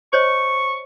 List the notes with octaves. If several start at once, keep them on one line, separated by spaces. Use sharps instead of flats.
C5 C#5 D#5 C#6